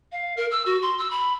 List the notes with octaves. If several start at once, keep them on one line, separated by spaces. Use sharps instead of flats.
F5
A#4
E6
F#4
C6
E6
B5